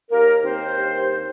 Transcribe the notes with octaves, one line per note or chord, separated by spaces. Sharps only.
D#2 A#3 A#4
D#2 C4 C5
G2